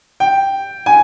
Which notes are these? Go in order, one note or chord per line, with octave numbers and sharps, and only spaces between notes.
G5
G#5